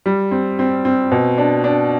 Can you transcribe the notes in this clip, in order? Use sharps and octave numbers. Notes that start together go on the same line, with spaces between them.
G3
C4
C4
C4
B2
D4
D4